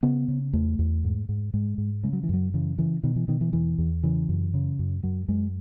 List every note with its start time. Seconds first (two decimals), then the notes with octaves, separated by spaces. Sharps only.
0.03 C#3 B3
0.28 C#3
0.53 E2 A3
0.79 E2
1.04 G#2
1.29 G#2
1.54 G#2 G#3
1.78 G#2
2.03 C#3 G#3
2.13 F#3
2.23 E3
2.29 F#2 F#3
2.54 C#3 E3
2.78 C#3 E3
3.03 B2 D#3
3.16 E3
3.28 B2 D#3
3.41 E3
3.53 E2 E3
3.78 E2
4.03 C#3 E3
4.29 F#2
4.54 C#3
4.79 F#2
5.03 F#2 F#3
5.28 F#2 G#3